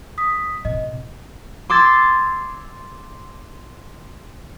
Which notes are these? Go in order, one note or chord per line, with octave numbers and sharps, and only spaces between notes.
D#6 B6
A2 C3 D#5
C6 D6 E6 G#6 A6